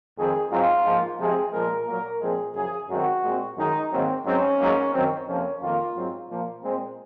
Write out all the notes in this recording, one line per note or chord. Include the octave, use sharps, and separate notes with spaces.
F2 D#3 G#3 C4 G#4
G#2 F#3 C4 F4
G#2 F3 A#3
C3 F3 G#3 C4 G#4
A#2 F3 G#3 A#4
A#2 F#3 A#3 A#4
A#2 F3 G#3 C4 G#4
F#2 C#3 F3 G#4
F#2 D#3 G#3 C4 F#4
A#2 G#3 C4
F#2 D#3 G#3 D#4
G#2 D#3 F#3 A#3 C4
G#2 F#3 C4 C#4
G#2 F#3 A#3
F#2 D#3 F#3 C4
F2 C3 F3 A#3 C#4
F2 D#3 A#3 F4
G#2 F#3 C4
A#2 F3 A#3
A#2 G#3 C4